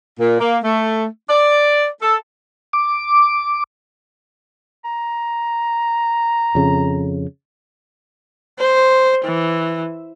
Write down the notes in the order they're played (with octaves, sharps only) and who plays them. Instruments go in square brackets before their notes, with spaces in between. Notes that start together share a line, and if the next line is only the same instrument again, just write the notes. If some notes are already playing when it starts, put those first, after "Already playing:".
[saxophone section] A#2
A#3
A3
D5
A4
[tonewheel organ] D6
[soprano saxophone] A#5
[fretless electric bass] F2 C#3
[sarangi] C5
E3